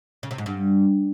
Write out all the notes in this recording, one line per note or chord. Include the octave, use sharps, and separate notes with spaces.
C#3
C3
G#2
G2